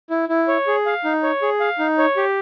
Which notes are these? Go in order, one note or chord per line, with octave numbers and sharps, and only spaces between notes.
E4
E4
C#5
G#4
F5
D#4
C#5
G#4
F5
D#4
C#5
G4